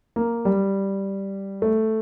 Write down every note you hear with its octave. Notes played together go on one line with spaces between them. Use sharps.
A#3
G3
A3